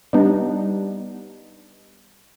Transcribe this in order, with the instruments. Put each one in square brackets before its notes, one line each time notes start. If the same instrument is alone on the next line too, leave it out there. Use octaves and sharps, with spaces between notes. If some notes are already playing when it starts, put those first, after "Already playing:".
[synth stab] G3 B3 D4 D#4